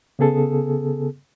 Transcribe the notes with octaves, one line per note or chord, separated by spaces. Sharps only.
C#3 B3 G#4 A4